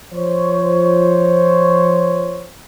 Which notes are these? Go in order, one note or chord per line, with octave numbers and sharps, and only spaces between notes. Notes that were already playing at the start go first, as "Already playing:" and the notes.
F3 C5 C#5